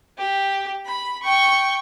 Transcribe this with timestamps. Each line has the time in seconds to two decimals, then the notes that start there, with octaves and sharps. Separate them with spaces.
0.18 G4
0.85 B5
1.23 G5 C#6